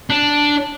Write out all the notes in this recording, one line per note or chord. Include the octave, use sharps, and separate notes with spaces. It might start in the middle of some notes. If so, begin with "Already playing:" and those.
D4